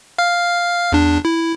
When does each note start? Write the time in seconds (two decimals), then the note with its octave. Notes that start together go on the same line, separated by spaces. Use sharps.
0.18 F5 F6
0.92 E2 D4
1.25 E4